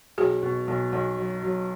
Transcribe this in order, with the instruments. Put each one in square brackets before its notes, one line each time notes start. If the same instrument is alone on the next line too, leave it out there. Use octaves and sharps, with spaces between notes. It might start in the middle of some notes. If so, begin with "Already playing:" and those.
[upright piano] B1 [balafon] F#4 G#4
[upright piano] B2
B1
B1
F#3
F#3